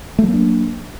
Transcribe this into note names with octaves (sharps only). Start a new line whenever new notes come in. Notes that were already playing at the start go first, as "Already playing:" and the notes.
F#3 A3 A#3 D4